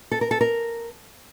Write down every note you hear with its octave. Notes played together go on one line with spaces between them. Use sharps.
A4
A#4
A4
A#4